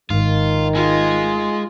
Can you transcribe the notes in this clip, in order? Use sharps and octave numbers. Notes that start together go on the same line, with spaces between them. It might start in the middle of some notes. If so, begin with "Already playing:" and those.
G#1 G#2 D#3 F4
G#3 F4